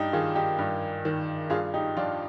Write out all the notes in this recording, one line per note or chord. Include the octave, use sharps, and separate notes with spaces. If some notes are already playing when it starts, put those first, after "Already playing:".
Already playing: G2 D#4 G4
D#3 F4 G#4
D#4 G4
G2
D#3
G2 F4 G#4
D#4 G4
F3 D4 F4